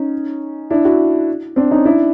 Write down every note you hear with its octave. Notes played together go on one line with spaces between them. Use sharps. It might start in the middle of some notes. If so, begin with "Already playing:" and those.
Already playing: C#4 D#4
D4 E4
E4 F#4
C4 D4
C#4 D#4
D4 E4